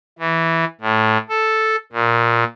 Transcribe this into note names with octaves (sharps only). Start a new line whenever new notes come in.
E3
A2
A4
A#2